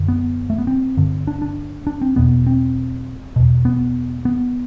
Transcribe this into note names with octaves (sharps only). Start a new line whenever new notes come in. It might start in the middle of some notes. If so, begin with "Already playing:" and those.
Already playing: F#2 D3
B3
A3
B3
C4
G2 D3
D4
D4
D4
C4
E2 B2 B3
C4
E2 B2
B3
B3